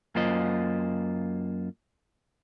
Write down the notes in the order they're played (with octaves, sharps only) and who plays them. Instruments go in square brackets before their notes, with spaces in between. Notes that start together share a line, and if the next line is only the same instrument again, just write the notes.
[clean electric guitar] F#2 A#3 F4 C5 D#5